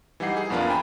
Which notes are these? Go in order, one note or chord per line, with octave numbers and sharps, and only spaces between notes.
E3 G3 D#4 F#5 C7
G#4
A#1 F2 B3 D4 F4 A#4
G5 G#5 A#5 B5 A6